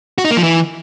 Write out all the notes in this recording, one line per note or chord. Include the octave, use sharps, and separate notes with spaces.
F#4
D#4
A#3
F3
E3